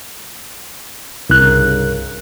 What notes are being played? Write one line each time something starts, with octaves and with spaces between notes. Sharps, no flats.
C2 G2 C#3 A#4 F#6